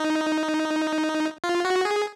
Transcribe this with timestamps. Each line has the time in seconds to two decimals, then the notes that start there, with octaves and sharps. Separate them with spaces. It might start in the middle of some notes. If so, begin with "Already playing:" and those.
Already playing: D#4
1.44 F4
1.65 F#4
1.85 G#4